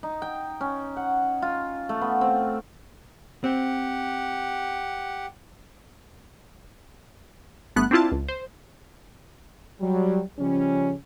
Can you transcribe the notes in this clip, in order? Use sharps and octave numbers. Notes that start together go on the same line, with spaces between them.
D#4
G5
C#4
F#5
F4
A3
B3
C4
C4 G4 F#5
G1 A3 B3 F#6
C4 D4 E4 F4 A5
C#2
C5
F#3 G3
C#3 F3 G3 G#3 C#4